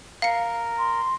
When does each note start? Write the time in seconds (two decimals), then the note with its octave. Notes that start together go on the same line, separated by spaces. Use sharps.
0.22 A#4 F5 C#7
0.78 C6